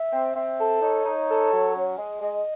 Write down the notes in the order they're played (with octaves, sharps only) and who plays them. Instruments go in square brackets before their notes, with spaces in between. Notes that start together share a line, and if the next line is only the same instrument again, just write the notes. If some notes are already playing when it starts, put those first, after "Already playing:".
Already playing: [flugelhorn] E5
[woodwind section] C4
[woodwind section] C4 [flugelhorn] E5
[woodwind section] A4
[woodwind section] D#4 [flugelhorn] C#5
[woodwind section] D#4
A4
F#3
C#4
G#3
[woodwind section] G#3 [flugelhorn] D#5